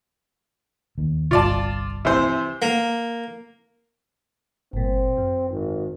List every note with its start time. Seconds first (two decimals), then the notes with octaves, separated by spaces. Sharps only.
0.98 D#2
1.31 G1 C2 F4 D5 A5
2.05 C3 E3 C5
2.62 A#3
4.73 G1 A#2 C4
5.17 F#2
5.50 G#1